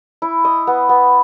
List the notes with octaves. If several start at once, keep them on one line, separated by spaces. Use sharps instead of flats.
E4
D#5
B3
B3